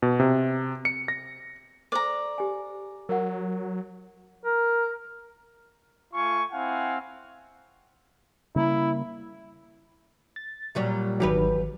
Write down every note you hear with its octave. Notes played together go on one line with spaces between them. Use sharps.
B2
C3
C#7
A#6
A4 C5 D5 A#5 D6
G4 G#5
F#3 A#4 F#5
A#4
A3 F4 G#5 C#6
C4 E4 F5 F#5 G#5
C#3 G3 A#3 E4
A6
A#2 F#3 G3
G#1 E2 D#3 F#3 G4 B4